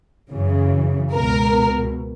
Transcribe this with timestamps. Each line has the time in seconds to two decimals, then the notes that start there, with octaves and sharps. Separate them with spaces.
0.30 F#2 C#3 E3
1.13 C#2 B2 A#4